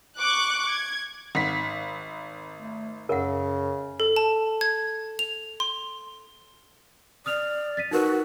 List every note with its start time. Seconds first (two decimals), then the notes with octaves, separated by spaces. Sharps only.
0.17 C#6 D6 F#6
0.69 G#6
1.35 G#1 F#5 B6
2.55 A3
3.09 F#2 C#3 A#4 F#5
4.00 A4
4.16 A5
4.61 G#6
5.19 F7
5.60 C6
7.26 D5 D#6 F6 F7
7.77 A6 B6 D#7
7.91 D#4 F#4 A#4 B4